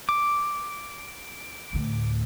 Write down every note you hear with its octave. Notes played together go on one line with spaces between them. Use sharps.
D6
D2 A2